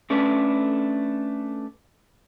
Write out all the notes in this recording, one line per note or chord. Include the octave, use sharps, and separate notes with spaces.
A3 C#4 D4 A4 B4